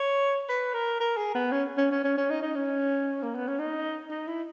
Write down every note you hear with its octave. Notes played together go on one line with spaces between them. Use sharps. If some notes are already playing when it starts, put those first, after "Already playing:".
Already playing: C#5
B4
A#4
A#4
G#4
B3
C#4
C#4
C#4
C#4
C#4
D#4
D#4
C#4
A#3
B3
C#4
D#4
D#4
E4